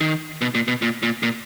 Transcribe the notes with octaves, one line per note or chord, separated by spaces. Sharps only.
D#3
B2
A#2
B2
A#2
A#2
A#2